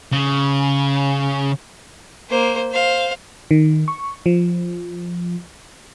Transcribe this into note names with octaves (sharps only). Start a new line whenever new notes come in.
C#3
A#3 C5
C5 F5
D#3
C#6
F3